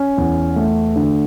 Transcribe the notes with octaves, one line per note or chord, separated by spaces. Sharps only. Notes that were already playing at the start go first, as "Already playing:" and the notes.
Already playing: C#4
E2
A3
D3